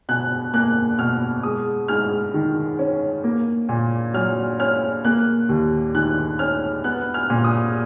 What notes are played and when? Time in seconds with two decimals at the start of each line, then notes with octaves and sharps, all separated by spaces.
0.09 B2 F#6
0.54 A#3 F#6
0.99 B2 F6
1.43 G#3 D#6
1.88 G#2 F6
2.34 D#3
2.79 C#4
3.24 A#3
3.69 A#2
4.14 F#3 F6
4.59 C#4 F6
5.05 A#3 F#6
5.49 D#2
5.95 D#3 F#6
6.39 C#4 F6
6.84 B3 F#6
7.14 F6
7.30 A#2
7.44 D#6